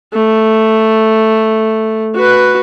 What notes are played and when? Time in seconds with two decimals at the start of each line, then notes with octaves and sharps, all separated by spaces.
0.14 A3
2.14 F#4 B4